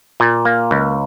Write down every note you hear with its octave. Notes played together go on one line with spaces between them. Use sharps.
A#2
A#3
C#2